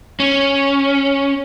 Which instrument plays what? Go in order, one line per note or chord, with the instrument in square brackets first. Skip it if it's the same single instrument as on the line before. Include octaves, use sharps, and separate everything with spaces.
[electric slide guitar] C#4